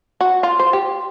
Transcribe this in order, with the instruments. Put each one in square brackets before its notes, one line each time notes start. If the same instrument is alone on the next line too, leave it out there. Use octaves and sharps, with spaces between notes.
[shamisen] F#4
F4
C5
G4